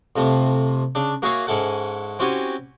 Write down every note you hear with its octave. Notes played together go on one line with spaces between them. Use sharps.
F2 C3 A3
C#3 D4
A#3 F#4 G#4 C#5 E5 F5
G#2 C#4 E4 A4 F#5
C4 C#4 E4 F#4 G4 G#5